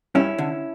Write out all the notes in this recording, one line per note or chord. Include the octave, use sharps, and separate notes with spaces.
G2 C#4 E4
D3